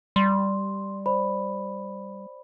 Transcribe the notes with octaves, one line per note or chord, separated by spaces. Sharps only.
G3 C6
C5 D5 B5